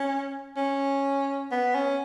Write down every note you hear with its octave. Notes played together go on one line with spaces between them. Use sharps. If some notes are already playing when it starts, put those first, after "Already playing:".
Already playing: C#4
C#4
B3
C#4